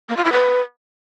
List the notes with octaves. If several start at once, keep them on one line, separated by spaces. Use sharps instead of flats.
A#3
F4
E4
B4